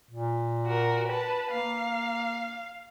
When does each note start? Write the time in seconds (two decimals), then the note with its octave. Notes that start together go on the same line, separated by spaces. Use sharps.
0.11 A#2
0.67 F#4 A#4
1.08 B4 A5
1.52 A#3 F5